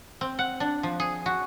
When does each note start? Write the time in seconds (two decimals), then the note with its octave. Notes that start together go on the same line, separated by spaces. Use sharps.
0.21 C4
0.39 F#5
0.60 D4
0.83 F3
1.00 G#4
1.26 F#4